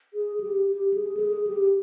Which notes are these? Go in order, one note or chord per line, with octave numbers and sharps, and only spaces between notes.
G#4
G4
G4
G#4
A4
G#4
G4